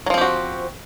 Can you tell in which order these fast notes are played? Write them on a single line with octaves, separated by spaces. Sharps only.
F#3 F3 C4 G4 F#4